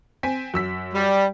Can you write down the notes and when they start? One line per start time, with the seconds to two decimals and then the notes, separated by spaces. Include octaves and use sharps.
0.23 C4 G#5 B6
0.54 F#2 E6 B6
0.93 G3